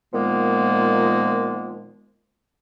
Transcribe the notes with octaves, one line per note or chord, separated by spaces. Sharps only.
A#2 D#3 F3 G#3 A#3 B3